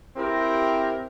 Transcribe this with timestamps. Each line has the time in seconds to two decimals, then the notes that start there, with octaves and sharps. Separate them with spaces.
0.16 C4 E4 G4 A#4